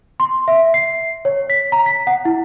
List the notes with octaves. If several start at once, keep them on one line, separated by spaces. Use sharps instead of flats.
C6
E5
C7
C#5
B6
A#5
B6
F#5
E4